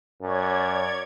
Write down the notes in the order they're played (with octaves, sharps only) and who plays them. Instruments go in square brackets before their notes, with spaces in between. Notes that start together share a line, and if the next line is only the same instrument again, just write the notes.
[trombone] F#2 [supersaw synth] C#5 D5 G#6